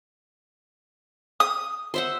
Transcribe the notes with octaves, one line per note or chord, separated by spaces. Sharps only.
D#6
C5 E5 F#5